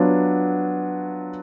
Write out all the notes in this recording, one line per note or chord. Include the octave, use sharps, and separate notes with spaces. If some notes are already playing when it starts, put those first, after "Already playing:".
Already playing: F#3 B3 D4 F4